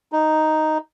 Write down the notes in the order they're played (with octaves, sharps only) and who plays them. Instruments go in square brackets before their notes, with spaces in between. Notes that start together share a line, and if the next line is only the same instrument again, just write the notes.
[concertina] D#4